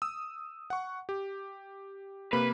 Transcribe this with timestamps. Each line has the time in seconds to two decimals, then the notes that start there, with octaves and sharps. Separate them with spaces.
0.02 D#6 E6
0.70 F#5 C#6
1.09 G4
2.33 C3 A#3 B4